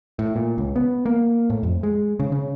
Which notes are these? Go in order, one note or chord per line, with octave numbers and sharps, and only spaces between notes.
A2
A#2
C#2
B3
A#3
A2
F2
G#3
C#3
C#3